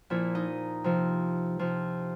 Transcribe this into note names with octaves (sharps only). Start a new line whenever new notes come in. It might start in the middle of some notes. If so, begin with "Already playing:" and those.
A#2 F3 E4
D#4
C3 F3
C3 F3